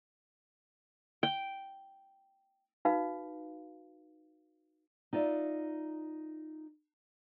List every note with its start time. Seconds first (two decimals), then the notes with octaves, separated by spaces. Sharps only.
1.23 G5
2.85 D#4 F#4 B4 F5
5.13 D#4 F4 D5 E5